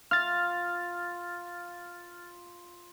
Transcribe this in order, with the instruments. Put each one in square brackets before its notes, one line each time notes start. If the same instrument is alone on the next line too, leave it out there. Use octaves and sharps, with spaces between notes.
[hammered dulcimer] F4 [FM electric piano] F6 A6